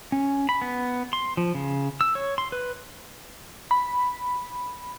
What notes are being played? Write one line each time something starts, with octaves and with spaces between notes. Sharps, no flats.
C#4
B5
B3
C6
F3
C#3
E6
C#5
C6
B4
B5